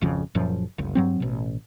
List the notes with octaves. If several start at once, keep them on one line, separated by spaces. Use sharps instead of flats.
G#1 F2 C#3
F#1 F#2 A#2 F3
F#1 C#2
G2 F#3 C4
A1 B2